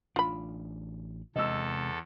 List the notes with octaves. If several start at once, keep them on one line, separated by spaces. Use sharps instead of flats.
A1 D4 F4 B5
E2 C3 G#3 A4 D#5 E6